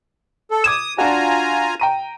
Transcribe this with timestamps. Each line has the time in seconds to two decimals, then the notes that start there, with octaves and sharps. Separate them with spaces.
0.51 A4
0.64 D6 D#6 G#6 E7
0.98 D4 F4 F#4 G#5 A#5
1.80 G5 A#5 D#7